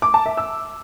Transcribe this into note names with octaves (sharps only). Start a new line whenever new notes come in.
D6
A5
E5
E6